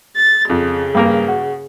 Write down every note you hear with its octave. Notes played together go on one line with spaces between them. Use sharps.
A6
F2 C#3
G2 A#3 A#4
F#4